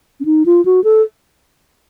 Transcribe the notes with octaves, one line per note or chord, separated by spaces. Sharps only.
C#4
D#4
F4
F#4
A4